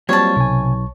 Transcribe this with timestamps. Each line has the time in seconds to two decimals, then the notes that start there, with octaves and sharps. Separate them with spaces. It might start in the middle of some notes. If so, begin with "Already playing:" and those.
0.09 F#3 G3 A#3 C4 F4 C#5 A5
0.36 B1 C3 G#5